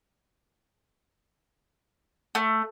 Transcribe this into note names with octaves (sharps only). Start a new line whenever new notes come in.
A3